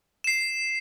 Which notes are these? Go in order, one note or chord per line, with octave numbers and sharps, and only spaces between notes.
C7 E7